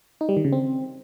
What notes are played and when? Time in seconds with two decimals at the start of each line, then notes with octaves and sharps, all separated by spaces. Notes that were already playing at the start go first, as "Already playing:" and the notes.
0.21 D#4
0.29 G3
0.37 D#3
0.45 C#3
0.53 C4